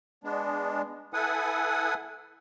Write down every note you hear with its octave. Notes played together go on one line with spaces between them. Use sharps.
G#3 B3 D4
E4 A4 B4 F#5 G#5 D#6